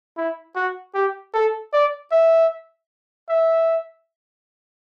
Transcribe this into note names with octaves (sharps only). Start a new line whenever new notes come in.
E4
F#4
G4
A4
D5
E5
E5